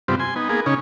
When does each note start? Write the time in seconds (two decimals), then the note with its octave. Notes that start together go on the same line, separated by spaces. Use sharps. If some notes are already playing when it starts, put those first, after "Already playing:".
0.08 G2 C3 G3 B3 C4 F4
0.20 G#5 C6
0.36 B3 D#4
0.49 A#3 B3 G#4
0.66 C#3 C#4 D#4